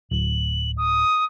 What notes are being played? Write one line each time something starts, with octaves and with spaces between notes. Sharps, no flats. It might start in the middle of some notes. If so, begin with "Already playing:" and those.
D1 F#7
D#6